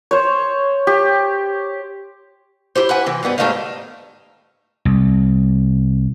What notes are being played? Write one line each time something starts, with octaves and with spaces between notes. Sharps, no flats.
C5 C#5
G4
E4 G4 C5
B4 F#5 G#5
C3 E3
G#2 G3 B3 G#4
G#2 G3 A3 E4 D#5 F5
C2